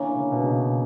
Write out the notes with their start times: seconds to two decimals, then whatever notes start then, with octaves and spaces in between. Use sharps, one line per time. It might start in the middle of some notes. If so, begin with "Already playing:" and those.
Already playing: D3 E3 A#3 C#4
0.15 C#3
0.32 B2
0.42 C#3